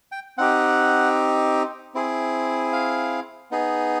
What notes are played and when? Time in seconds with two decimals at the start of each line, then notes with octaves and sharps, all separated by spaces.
0.12 G5
0.38 C4 D#4 G4 F#5
1.94 C4 E4 G#4
2.73 F5
3.51 B3 D#4 G#4